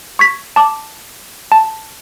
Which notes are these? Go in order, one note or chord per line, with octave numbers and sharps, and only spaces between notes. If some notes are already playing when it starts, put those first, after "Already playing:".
C#6 G#6 B6
A5 D6
A5